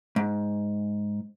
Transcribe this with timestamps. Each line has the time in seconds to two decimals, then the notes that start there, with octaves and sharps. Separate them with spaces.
0.16 G#2